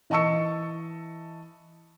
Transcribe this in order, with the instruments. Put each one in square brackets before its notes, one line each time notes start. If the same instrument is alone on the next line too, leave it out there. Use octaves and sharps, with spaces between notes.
[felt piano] E3 D#5 A5 C#6 E6 C#7